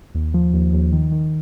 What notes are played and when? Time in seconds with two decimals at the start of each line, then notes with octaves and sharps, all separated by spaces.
0.15 D#2
0.34 F3
0.54 D#2
0.73 D#2
0.92 D#3
1.12 D#3